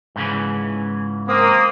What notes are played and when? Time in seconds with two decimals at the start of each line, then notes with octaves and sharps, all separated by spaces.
0.16 G#2 C#3 E3
1.28 A#3 C4 D#6